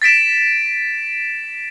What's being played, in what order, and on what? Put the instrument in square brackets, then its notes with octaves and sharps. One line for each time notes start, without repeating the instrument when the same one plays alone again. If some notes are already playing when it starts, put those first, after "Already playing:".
[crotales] A6 B6 D7 E7